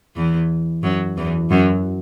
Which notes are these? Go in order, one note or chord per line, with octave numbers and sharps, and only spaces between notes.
E2 E3
F#2 F#3
E2 E3
F#2 F#3